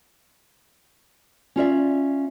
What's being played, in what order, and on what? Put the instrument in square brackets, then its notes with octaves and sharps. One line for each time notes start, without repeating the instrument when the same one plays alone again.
[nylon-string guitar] C#4 F4 D5 E5